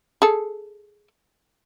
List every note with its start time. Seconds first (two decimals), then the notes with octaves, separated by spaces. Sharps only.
0.22 G#4 A4